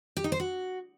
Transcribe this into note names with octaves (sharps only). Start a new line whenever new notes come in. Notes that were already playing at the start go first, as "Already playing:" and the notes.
G4
D#4
C5
F#4